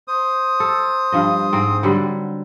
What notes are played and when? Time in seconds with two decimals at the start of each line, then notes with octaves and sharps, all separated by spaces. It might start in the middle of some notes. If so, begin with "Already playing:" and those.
0.08 C5 D#6
0.60 A4
1.12 G2 F3 D#5
1.53 G#2 C4
1.83 D3 F#3 G3